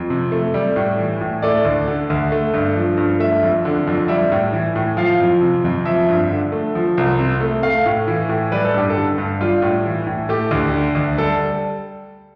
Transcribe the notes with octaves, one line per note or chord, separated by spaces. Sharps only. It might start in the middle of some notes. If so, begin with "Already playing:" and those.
Already playing: F2
C3
A3
G3
A2
E3
A2
A3 D5
D2
D3
D2
A3
G2
F3
G2
A3 E5
F2
D3
F2
G3 E5
A2
E3
A2
F3 F5
F2
C3
F2
F3 E5
G2
D3
A3
F3
C2
C3
A3
A3 F5
A2
E3
A2
G3 B4
A4
G2 G4
A4
D3
G2
G3 F4
A2
E3
A2
A3 G4
D2
D3
D2
G3 A4